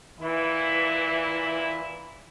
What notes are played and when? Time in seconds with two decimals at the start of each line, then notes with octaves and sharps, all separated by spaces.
0.20 A#2 E3 E4